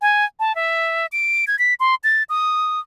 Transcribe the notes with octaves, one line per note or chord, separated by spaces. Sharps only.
G#5
A5
E5
D7
G#6
B6
C6
A6
D#6